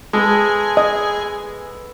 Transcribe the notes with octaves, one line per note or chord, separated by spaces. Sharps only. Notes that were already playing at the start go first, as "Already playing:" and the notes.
G#3 B3 G#4 A4
D#5